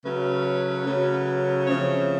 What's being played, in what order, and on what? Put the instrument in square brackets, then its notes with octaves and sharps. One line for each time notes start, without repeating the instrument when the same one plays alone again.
[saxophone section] C#3 F#3 A3 C#4 B4
C#3 F#3 A3 C#4
C#3 F3 A3 C4 C#5